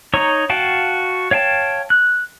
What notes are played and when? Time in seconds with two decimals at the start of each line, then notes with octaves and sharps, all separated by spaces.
0.14 D#4 C#5 A#5 C#6
0.50 F#4 F5 G5 A5
1.31 C#5 F5 G5 A5
1.90 F#6